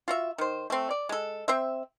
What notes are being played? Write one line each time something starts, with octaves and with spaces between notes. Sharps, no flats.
F4 F#4 E5
D#3 C5
A3 C4
D5
G#3 A4
C4 C5 E5